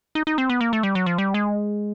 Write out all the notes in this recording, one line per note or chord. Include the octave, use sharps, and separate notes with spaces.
D#4
D#4
C4
B3
A#3
A3
G3
F#3
F3
G3
G#3